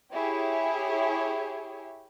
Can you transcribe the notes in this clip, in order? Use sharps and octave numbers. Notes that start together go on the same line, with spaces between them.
E4 G4 G#4 C#5